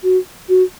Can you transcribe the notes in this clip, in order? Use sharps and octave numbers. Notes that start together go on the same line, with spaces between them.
F#4
F#4